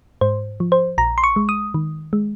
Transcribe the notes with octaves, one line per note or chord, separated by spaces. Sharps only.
G#2 C5
F3
C5
A#1 A#5
C6
C#6
G#3
D#6
D#3
G#3